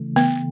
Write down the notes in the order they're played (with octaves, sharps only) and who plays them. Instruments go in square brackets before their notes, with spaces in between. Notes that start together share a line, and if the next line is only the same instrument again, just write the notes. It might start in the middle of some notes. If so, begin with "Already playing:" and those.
Already playing: [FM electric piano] C#3 E3 A3
[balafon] B3